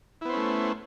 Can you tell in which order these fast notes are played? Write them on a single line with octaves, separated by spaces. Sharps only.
E4 B3 C5 C#4 A3